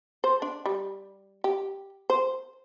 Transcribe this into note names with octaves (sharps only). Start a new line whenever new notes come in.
C5
D4
G3
G4
C5